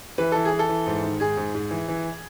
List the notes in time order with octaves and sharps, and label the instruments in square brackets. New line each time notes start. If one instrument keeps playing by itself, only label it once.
[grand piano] E3 B4
E3 A4
G#4
E3
A4
E3
G#2
D#3
G#2 G#4
G#2
G#2
E3
E3